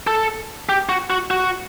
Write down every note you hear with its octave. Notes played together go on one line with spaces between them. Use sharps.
A4
G4
F#4
F#4
F#4